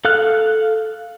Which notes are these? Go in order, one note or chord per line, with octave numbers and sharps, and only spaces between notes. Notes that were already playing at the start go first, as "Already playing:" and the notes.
A4 F5 F6 F#6